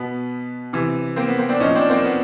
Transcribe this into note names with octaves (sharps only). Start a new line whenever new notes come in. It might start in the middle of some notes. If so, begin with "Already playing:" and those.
Already playing: B2 B3
C3 E3
A#3 C4
B3
A#3 C4
C4 D4
A#2 F3 C#4 D#4
C4 D4
A#3 C4
B3